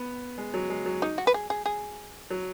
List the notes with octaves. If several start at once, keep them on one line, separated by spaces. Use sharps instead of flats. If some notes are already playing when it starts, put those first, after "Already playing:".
Already playing: B3
G#3
F#3
G#3
F#3
D#4
F#4
B4
G#4
G#4
G#4
F#3